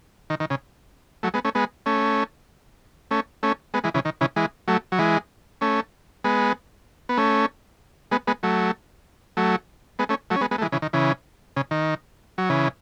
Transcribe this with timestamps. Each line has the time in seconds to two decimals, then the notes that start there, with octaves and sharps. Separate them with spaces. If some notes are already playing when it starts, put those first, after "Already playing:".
0.30 D#3
0.40 D#3
0.50 C#3
1.23 F#3 A3
1.34 G#3 B3
1.45 A3 C#4
1.55 G#3 B3
1.86 A3 C#4
3.11 A3 C#4
3.43 A3 C#4
3.74 G#3 B3
3.84 E3 G#3
3.94 C#3 E3
4.05 D#3
4.21 C#3 E3
4.36 E3 G#3
4.68 F#3 A3
4.92 F#3
4.99 E3 G#3
5.61 A3 C#4
6.24 G#3 B3
7.09 B3
7.17 A3 C#4
8.11 G#3 B3
8.27 G#3 B3
8.43 F#3 A3
9.37 F#3 A3
9.99 G#3 B3
10.09 A3 C#4
10.30 F#3 A3
10.36 C#4
10.41 G#3 B3
10.51 G#3 B3
10.58 A3
10.62 E3 G#3
10.72 C#3 E3
10.82 D#3
10.93 C#3 E3
11.56 C#3
11.71 D#3
12.38 F#3
12.50 C#3 E3